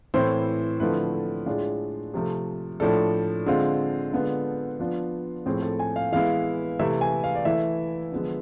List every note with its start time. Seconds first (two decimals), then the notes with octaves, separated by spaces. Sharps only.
0.14 A2 E3 A3 C4 E4 C5
0.80 D3 F3 A3 C4 E4 B4
1.14 A4
1.46 A2 G#3 D4 F4 G#4
2.14 C3 F3 A3
2.80 A2 F3 A3 D4 A4
3.46 D3 G#3 C4 F4
4.13 D3 G#3 B3 F4 A4
4.80 F3 B3 D4 F4
5.46 A2 F3 A3 C4 G#4
5.62 A4
5.79 G#5
5.96 F5
6.12 E3 G#3 B3 E4 F5
6.79 C3 E3 A3 E4 E5
7.01 G#5
7.24 F5
7.35 D5
7.45 E3 A3 E4 E5
8.12 D3 F3 G#3 B3